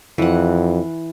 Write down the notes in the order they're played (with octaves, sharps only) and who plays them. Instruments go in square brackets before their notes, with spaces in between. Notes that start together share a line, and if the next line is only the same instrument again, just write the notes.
[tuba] F2 [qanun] E3 F#5